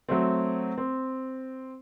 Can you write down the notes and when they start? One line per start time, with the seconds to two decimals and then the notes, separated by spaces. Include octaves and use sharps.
0.09 F#3 A3 C4
0.78 C4